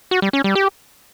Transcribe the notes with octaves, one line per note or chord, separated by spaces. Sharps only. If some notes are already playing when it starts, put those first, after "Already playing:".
F#4
G3
C#4
G3
G4